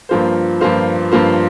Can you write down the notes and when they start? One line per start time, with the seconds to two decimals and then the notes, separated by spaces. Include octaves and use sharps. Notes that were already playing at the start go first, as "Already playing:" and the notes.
0.09 G2 F3 A#3 F4 C5
0.61 G2 F3 A#3 F4 C5
1.12 G2 F3 A#3 F4 C5